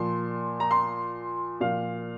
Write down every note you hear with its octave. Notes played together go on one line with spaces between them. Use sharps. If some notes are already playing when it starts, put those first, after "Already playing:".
Already playing: A#2 F3 C6
A#5
C6
A#2 F3 F5